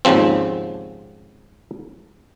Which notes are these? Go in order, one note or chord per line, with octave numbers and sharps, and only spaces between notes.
G#1 D#2 C#3 F3 C4